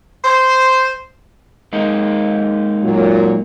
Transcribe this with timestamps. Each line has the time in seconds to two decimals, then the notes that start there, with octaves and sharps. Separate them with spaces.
0.24 C5
1.73 G#3 A#3 D#4
2.84 A#2 F#3